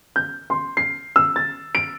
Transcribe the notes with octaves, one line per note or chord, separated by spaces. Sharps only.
G6
C6
C7
E6
A6
D7